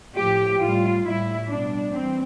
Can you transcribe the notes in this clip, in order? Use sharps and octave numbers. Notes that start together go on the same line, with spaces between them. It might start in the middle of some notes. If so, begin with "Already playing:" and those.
A2 F3 G4
A2 G3 F4
A2 G3 E4
B2 G3 D4
E3 G3 C4